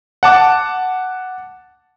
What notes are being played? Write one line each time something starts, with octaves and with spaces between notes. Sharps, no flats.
F#5 A5 D6